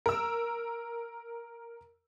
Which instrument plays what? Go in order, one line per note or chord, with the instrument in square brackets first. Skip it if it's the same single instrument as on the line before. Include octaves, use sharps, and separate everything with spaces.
[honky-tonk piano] A#4 E6